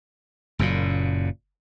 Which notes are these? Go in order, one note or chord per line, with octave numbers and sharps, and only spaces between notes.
F#1 F#2 A#2